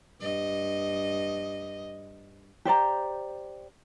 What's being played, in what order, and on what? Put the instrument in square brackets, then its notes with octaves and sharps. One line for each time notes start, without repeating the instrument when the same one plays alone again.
[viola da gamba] G2 D#5
[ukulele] G4 C5 D5 A#5